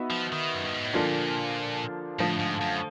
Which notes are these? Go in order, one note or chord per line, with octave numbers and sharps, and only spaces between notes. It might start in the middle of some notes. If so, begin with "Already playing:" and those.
Already playing: B3 D#4 F#4 B4 E5
F3
D#3
F#2
G2
G#2
A2
A#2 D3 F3 A#3 D4 F4
A2 D3 F3 A3
G#2
F#2